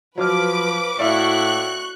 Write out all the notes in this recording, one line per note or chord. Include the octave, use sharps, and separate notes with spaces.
F3 F#3 B4 D6 F6
A2 E4 F#4 D5 E5 F5 C#6 F#6